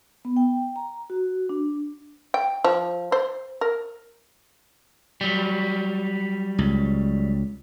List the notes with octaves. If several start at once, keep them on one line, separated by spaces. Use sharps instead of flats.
B3
G5
A#5
F#4
D4
G5
F3
C5
A#4
F#3 G3
C#2